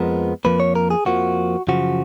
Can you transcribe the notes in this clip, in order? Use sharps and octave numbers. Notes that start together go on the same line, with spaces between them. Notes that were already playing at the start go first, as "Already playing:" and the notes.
Already playing: F2 F3 G#3 B3 A#4
F2 F3 A#3 B4
C#5
A#4
G#4
F2 F3 A#3 F#4
F#2 C#3 F3 F#4